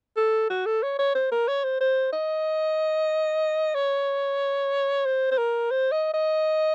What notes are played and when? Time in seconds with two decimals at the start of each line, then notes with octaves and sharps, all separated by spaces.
0.17 A4
0.50 F#4
0.66 A4
0.83 C#5
0.99 C#5
1.15 C5
1.32 A#4
1.48 C#5
1.64 C5
1.81 C5
2.12 D#5
3.75 C#5
5.06 C5
5.31 C5
5.38 A#4
5.71 C5
5.92 D#5
6.14 D#5